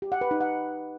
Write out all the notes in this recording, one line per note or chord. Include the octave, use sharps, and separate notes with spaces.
G4
F#5
B4
D#4
F#5